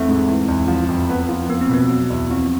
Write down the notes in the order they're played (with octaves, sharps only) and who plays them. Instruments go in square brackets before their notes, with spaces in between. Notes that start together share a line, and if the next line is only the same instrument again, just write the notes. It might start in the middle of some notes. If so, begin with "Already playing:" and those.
Already playing: [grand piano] E2 A3 [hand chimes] C4
[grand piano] G#2
E3
E2
F3
F2
B3
F3
[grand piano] A#3 [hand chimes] B3
[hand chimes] C4
[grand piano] B2 [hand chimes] B3
[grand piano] F#3
E2
[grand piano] F3 [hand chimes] C4